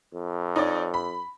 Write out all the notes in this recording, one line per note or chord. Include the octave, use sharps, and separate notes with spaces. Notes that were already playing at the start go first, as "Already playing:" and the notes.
F2
D#4 C#5 D5
B5